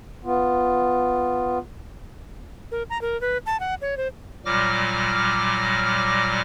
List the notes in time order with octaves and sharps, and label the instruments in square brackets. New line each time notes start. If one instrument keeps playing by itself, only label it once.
[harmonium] B3 F4
[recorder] A#4
A#5
A#4
B4
A5
F#5
C#5
C5
[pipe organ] A#2 F#3 G3 D6 F6 A#6